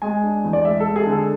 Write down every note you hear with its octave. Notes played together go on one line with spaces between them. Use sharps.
G#3 G#5
D4
E2
D5
G#3 E5
A4
G#3
G#4
D3 A4